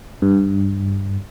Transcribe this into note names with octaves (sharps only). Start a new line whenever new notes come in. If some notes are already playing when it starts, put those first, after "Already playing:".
G2